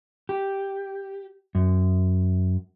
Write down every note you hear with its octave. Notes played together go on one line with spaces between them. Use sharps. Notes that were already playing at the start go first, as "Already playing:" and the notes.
G4
F#2